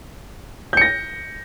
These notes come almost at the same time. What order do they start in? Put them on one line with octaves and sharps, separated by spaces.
G6 C#7 A#6